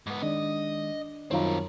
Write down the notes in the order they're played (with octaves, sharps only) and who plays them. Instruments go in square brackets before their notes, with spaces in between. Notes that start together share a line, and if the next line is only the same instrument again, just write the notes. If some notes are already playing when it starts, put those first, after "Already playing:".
[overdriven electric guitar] G#2 B3
[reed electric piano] D#3 G#3 [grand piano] D4 [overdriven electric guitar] D#5
[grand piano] F#2 D#4 F4 [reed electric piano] D#3 G3 C#5 [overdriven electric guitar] C4 A#4